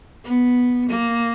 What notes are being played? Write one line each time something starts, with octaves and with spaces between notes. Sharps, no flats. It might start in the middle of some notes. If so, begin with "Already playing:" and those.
B3
A#3